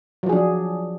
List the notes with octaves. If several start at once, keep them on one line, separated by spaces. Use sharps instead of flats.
F3 F#3 D4 G#4